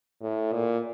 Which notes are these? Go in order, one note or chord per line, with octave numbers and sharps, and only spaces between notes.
A2
A#2